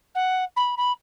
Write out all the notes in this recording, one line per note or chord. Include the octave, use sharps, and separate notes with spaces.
F#5
B5
B5